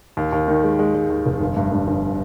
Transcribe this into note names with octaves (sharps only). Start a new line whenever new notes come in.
D#2
D#2
D#3
G#3
G#3
G#3
D#2
F1
G1
G2
G2
G1